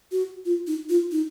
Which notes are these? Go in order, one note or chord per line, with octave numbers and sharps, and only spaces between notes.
F#4
F4
D#4
F4
D#4